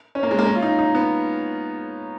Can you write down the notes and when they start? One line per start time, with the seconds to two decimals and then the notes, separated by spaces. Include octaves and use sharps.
0.15 C#4
0.23 A#3
0.31 G#3
0.39 A#3
0.46 C#4
0.55 F4
0.62 D#4
0.79 D#4
0.95 B3